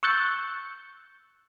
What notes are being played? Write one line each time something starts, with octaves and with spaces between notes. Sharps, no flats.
C#6 E6 F#6 G6 A6 C#7